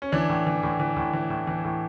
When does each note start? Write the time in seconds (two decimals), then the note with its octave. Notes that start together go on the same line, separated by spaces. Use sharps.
0.02 C#4
0.12 E3 D4
0.29 A2
0.47 E3
0.63 A2
0.80 E3
0.96 A2
1.13 E3
1.30 A2
1.47 E3
1.65 A2